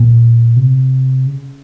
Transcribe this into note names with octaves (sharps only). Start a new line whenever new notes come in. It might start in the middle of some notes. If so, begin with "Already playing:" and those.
Already playing: A#2
C3
C#3